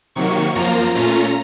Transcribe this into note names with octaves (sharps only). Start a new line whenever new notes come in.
C3 D#3 F#3 A#3 C#6
F#2 F3 A#3 F4 A#5
A#2 A3 C#4 F4 A#5